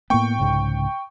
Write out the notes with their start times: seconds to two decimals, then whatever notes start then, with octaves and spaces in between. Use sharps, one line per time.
0.10 A2 A#3 B3 G5 C#6
0.39 C2 G#2 C#3